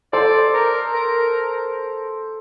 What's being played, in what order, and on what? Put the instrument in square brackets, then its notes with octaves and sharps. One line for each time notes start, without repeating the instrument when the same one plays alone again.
[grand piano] A4 C5 [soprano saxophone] D5
[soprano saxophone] A#4
A#4